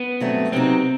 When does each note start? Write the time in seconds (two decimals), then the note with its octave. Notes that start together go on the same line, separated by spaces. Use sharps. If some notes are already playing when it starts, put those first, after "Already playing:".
Already playing: B3
0.20 G2 F#3 A3 C4 F#4
0.52 C3 F#3 B3 C4 D#4